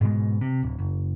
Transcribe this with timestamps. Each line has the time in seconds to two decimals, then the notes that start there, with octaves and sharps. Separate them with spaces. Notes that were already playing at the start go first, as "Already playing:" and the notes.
0.01 G#2 B2 G#3
0.41 C3
0.63 D1
0.79 F#1